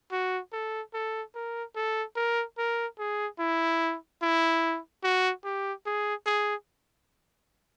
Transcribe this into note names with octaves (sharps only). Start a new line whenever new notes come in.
F#4
A4
A4
A#4
A4
A#4
A#4
G#4
E4
E4
F#4
G4
G#4
G#4